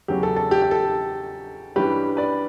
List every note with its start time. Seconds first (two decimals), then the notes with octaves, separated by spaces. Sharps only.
0.08 E2 C#3 F#3 C#4 G4
0.23 A4
0.36 A4
0.51 G4
0.62 G4
0.71 A4
1.75 G2 E3 G3 C#4 G4 B4
2.17 B4 D5